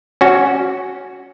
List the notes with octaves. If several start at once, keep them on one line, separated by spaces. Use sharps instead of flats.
C#4 F#4